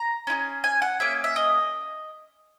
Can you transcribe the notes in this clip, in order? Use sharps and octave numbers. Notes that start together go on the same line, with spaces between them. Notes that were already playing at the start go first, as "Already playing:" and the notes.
Already playing: A#5
C#4 E4 G#4
G#5
F#5
A#3 C#4 G#4 E5
E5
D#5